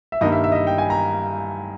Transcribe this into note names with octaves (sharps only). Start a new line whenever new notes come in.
E5
G2 D#3 G3 A#3 D#5
E5
E5
D#5
E5
G5
G#5
A#5